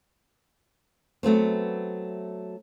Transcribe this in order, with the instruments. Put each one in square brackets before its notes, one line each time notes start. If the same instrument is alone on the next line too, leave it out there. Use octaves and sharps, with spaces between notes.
[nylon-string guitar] F#3 A3 B3 C4